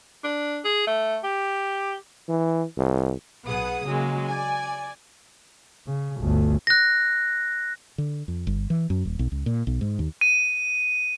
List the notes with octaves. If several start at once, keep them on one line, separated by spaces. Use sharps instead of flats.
D4
G#4
A3
G4
E3
C2
B1 B3 G#4 F#5 D#6
C#3 F#3 G#3 A#3
D5 G#5
C#3
G1 D2
F#6 A#6
D3
F2
G1
E3
F#2
D#1
B1
C#2
A#2
B1
G#2
D#2
D#7